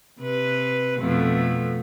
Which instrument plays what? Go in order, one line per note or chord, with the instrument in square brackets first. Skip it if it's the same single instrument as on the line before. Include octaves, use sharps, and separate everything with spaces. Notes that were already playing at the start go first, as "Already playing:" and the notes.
[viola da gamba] C3 B4
F2 B2 A3